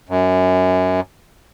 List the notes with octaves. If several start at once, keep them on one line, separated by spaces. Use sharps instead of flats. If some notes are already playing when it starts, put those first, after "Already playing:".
F#2